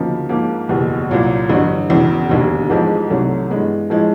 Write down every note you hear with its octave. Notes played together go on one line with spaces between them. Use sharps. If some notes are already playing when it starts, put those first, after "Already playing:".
Already playing: D2 C#3 F3 A#3 D#4
G#2 F3 A#3
F#1 E2 B2 G3
C2 A#2 F#3
A1 G2 D3 F#3
E1 E2 C#3
E1 D#2 D3
A1 G#2 F3 G#3
C2 C3 D#3 F#3 A3
G2 E3 G#3 B3
A2 F3 G#3